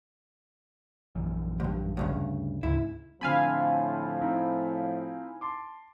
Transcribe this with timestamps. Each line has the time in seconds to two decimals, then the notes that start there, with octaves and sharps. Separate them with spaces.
1.15 A#1 F#2 E3
1.60 D2 G2
1.97 D2 G2 C#3
2.63 D2 G#2 C#3 E4
3.21 A2 D3 F3 C4 F5 G#5 B5
4.21 C4 D#4 E4
5.41 A5 C6 D6